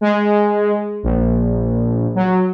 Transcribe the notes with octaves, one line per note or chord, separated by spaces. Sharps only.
G#3
A#1
F#3